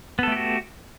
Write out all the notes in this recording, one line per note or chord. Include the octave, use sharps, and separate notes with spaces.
A3 B3 F#4 G4 A4